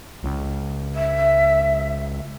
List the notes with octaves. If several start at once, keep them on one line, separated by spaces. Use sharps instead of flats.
C#2
E5